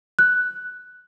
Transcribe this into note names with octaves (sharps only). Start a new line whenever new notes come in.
F#6